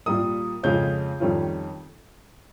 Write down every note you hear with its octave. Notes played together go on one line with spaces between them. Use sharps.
A#2 G3 A#3 D#6
F2 C#3 G#3 C#4 F4 G6
F2 D#3 G3 C#4 F4